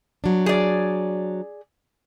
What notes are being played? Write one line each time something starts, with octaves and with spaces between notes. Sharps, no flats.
F#3 D4
G#4 D5